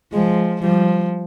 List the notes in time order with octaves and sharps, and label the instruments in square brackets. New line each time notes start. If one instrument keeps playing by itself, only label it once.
[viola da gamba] F3 [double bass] G#3
[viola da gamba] F3 [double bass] G3